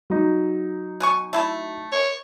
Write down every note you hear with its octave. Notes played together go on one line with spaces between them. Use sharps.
F#3 D#4
B2 G#5 C#6
A3 E4 A5
C#5